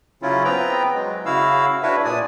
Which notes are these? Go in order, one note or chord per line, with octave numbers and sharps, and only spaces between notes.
C#3 F#3 C#4 E4 F4
B3 C4 B4 G5 A#5
F#3 G#3
C#3 E4 F#4 F5 E6
D4 E4 F#4 B4 C#5 E5
A#2 D5 G#5 D#6